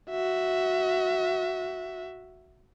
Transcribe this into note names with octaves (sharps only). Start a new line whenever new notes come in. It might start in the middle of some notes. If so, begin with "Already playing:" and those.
F#4 E5